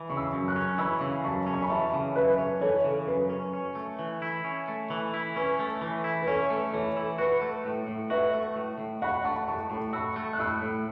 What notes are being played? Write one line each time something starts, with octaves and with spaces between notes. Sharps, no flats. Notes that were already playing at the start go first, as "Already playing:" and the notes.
Already playing: E3
C#3 C#6
B5 E6
F#2
C#6 F#6
C#4
E3 B5 E6
C#3
F#2 A5 C#6
C#4
C#6
B5
E3 E5 A5
C#3
F#2 B4 E5
C#4
E3 A4 C#5
C#3
F#2 B4
C#4
C#4
A3
E3
E4
C#4
A3
E3
E4
C#4 B4
A3
E3
E4
B4
C#4 A4 C#5
A3
E3 A4 C#5
E4
F#4 B4
A3
A2
A2
F#4 B4 E5
A3
A2
A2
F#4 F#5 B5
A3 A5 C#6
A2 A5 C#6
A2 A5 C#6
F#4 B5 E6
A3
F#6
A2 B5 E6
A2